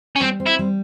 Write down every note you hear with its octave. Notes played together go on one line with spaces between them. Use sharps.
C#4
G3 C4
C4
E4
G3